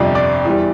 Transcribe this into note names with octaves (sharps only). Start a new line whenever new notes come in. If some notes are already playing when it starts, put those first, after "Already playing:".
Already playing: G1 F2 C3 F3 D5
D5
E2 E3 G3